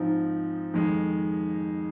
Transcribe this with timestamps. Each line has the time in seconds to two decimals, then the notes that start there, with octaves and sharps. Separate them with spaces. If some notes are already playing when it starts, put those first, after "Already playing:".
Already playing: G#2 F3 C4 D#4
0.74 F2 D#3 G#3